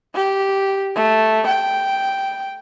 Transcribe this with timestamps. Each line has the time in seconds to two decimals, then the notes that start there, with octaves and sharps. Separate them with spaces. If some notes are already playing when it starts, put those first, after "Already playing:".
0.15 G4
0.95 A3
1.47 G5